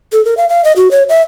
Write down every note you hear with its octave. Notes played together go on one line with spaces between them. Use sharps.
A4
A#4
F5
F5
D#5
F#4
C#5
E5